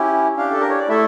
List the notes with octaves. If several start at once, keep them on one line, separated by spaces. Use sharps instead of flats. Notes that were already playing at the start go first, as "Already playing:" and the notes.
Already playing: C#4 E4 G4
D4 G4 F5
A4
A#4
C#5
D5
A3 E4 A4 E5